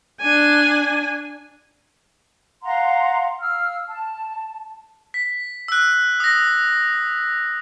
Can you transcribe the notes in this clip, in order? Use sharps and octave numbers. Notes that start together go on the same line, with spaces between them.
D4 G#5
F5 F#5 A#5 C6
F5 E6 F6
A5
B6
E6 F#6
D#6 A#6